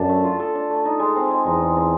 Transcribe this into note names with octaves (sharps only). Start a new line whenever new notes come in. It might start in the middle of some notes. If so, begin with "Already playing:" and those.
Already playing: F#2 D4 A4
A3
F4
A4
D4
A3
D#4
G#3
C4
G#3
E2 D#4
G#3
C4